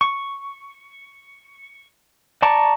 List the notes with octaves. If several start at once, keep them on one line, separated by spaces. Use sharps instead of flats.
C#6
D5 A5 A#5 C#6 D6